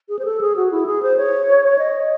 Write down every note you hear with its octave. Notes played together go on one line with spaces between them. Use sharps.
G#4
C5
A4
G#4
F#4
E4
G#4
C5
C#5
D#5